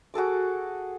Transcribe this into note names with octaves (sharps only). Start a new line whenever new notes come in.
F#4 G#4 A4 D6